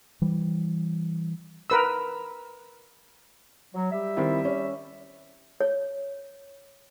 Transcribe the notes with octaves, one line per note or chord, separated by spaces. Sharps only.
E3 G3
A#4 B4 E6
F#3
G3 G4 E5
D#3 C4 E4
C#4
C#5